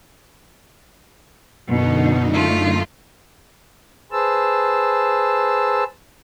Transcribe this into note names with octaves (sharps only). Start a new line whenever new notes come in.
F#2 B2 D3 D#4
A3 F4
G#4 B4 C5 A5 E6